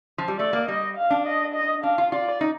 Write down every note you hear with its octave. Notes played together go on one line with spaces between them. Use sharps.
F3
G3
A3 D5
A#3
G3 D#5
F5
D4
D#5
D#5
D4 F5
F4
F4 D5
D#4